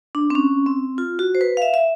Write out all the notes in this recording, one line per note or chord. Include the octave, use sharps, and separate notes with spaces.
D4
C4
C#4
C4
F4
F#4
C5
B4
F5
E5
E5